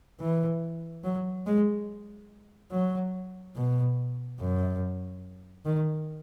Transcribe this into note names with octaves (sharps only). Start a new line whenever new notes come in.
E3
F#3
G#3
F#3
B2
F#2
D#3